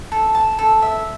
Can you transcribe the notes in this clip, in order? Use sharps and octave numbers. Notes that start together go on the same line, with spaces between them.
A4
A5
A4
E5